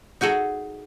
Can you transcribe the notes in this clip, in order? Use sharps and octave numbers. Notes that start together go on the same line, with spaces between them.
D#4 F#4 G#4 A4